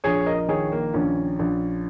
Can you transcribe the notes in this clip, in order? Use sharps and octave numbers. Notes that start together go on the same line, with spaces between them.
A#1 G#4 C#5
A#4 D#5
D#5
D#3 G#4 C#5
A#3
A#1 C#4
A#1